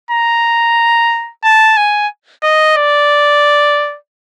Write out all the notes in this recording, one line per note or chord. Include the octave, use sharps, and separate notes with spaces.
A#5
A5
G#5
D#5
D5